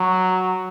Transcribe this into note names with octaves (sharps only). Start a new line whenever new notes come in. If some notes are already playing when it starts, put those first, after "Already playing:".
Already playing: F#3